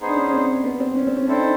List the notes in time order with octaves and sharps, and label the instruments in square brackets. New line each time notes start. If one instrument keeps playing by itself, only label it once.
[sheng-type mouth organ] B3 D#4 G#4 C5
[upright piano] D4
C#4
C4
B3
C4
C#4
C4
C#4
[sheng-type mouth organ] C4 E4 A4 C5 [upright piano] D4
[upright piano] D#4